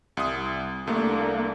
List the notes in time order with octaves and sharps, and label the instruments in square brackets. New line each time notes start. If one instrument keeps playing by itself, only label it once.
[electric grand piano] C2 D#6
[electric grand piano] C2 A3 [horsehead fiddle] A#3 D4